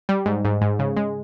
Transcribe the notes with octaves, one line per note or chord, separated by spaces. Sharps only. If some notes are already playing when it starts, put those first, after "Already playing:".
G3
G#2
G#2
G#2
C#3
G#3